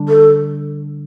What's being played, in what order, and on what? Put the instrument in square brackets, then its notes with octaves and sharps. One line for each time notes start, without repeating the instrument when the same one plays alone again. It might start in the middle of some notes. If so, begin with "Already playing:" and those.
Already playing: [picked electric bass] D3 G3 D4
[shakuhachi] A4